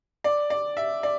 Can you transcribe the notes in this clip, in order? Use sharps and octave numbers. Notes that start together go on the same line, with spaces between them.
D5
D5
E5
D5